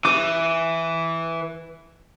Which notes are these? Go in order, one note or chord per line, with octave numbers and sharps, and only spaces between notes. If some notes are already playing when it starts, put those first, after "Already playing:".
E3 D6